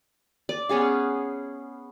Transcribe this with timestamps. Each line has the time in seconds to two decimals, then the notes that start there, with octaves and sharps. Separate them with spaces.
0.49 D5
0.69 B3 C#4 G#4 F5